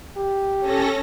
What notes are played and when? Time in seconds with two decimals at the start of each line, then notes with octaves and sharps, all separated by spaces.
0.17 G4
0.60 C#4 A4 A#6